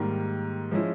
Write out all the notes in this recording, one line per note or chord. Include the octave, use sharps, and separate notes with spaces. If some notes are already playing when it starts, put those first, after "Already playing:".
Already playing: G#2 D#3 G3 A#3
F3 G#3 C#4 E4